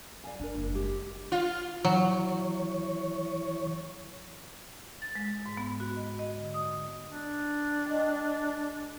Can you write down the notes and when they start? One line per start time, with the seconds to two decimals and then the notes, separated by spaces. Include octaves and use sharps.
0.24 D5 F5 G#5
0.40 E3 D4 A#4
0.55 F#1
0.73 G#3 G4
1.32 F4
1.85 E3 F#3 C#5
5.02 A6
5.15 G#3
5.46 G#2
5.57 B3
5.80 F#4
5.96 D#5
6.19 D#5
6.37 D3
6.54 D#6
7.09 D4
7.85 G#3 D#5 G5